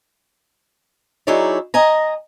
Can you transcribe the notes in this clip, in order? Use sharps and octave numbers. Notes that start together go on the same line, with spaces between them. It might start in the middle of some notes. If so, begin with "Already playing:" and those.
F#3 D#4 E4 G#4 C#5 D5
D#5 G#5 A#5